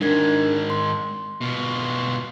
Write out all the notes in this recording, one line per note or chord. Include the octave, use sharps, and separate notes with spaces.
G#2 D#3 D4 A#4 G#6
C6
B2 F4